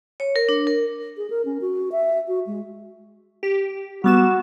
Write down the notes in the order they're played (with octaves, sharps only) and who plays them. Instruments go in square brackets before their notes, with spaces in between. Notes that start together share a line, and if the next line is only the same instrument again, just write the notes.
[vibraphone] C#5
A#4
D4
A#4
[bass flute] G#4
A#4
C#4
F#4
E5
F#4
G#3
[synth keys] G4
[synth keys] G3 B3 E7 [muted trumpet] F#4